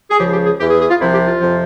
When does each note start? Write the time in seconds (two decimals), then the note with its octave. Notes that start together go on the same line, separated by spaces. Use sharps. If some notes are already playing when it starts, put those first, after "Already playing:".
0.10 G#4
0.18 C#2 C#3 F3 G4
0.32 G4
0.45 G#4
0.58 E2 E3 G4
0.69 G#4
0.79 G#4
0.89 F4
0.99 C2 C3 F3 E4
1.13 G4
1.27 F4
1.40 F2 C3 F3